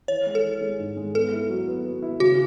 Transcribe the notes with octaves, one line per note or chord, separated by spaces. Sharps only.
E3 C#5
G#3
A4
E3
G#3
G#2
G#3
B3 A4
E4
F#3
B3
B3
E4
C#3 F#4